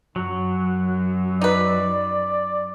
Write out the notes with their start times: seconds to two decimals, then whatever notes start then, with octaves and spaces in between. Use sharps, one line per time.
0.16 F#2 F#3
1.41 D#4 B4 D5